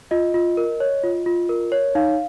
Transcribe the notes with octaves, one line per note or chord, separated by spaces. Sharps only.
F4 D#5
F4
A#4
C#5
F4
F4
A#4
C#5
D#4 F5